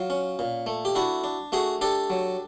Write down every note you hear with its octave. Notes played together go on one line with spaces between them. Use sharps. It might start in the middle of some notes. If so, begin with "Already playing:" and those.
Already playing: F#3 F4
C#4
A#2
A3
G4
D4 E4 F#4
D4
A3 F#4 G#4
D4 G4 A4
F#3